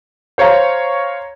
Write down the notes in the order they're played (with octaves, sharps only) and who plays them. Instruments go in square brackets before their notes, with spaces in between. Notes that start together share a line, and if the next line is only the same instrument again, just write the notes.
[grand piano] C5 C#5 F5 A#5